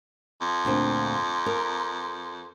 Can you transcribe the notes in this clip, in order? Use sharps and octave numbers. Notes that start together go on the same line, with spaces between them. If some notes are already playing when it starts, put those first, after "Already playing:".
F2
D2 A#2 C4
A#4